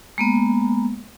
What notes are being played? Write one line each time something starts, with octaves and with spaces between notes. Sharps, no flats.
G#3 A#3 B3